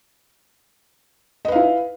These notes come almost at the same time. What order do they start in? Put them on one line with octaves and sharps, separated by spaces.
D#5 B4 F5 E4